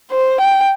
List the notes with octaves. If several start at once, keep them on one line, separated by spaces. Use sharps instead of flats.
C5
G5